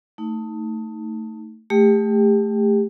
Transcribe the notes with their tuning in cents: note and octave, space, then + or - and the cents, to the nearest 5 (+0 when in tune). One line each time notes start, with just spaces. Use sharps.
A3 +20 D#4 +15
A3 -5 G4 +35 G5 +0